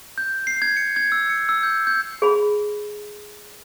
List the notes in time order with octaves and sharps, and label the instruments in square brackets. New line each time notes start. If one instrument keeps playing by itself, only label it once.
[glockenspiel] G6
C7
G#6
C#7
G#6
E6
C#7
E6
G6
G6
[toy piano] G#4 B5